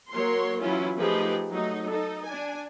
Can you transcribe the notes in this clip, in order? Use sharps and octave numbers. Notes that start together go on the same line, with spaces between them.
F#3 A#3 A#4 C#5 C6
E3 F#3 C#4 E4 F4
F3 A3 D#4 G4 G#4 B4
F#3 A3 D#4
D#4 A4
D4 G#5